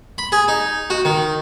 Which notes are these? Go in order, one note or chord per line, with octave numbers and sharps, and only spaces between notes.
B5
G#4
D#4
F#4
D#3